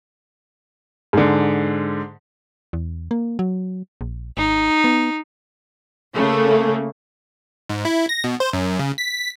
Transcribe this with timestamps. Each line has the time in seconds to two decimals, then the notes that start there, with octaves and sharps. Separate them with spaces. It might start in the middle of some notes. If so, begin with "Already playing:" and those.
1.13 G#2 D3
2.73 E2
3.11 A#3
3.39 F#3
4.01 A#1
4.37 G#1 D#4
4.84 B3
6.15 C#3 A3 A#3
7.70 G#2
7.85 E4
8.09 A#6
8.24 B2
8.40 C5
8.53 F#2
8.79 C#3
8.98 B6